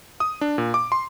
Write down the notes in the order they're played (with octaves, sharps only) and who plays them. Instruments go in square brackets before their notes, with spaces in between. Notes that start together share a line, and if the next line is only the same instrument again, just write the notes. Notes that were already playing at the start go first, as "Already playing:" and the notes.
[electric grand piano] D#6
D4
A#2
D6
C6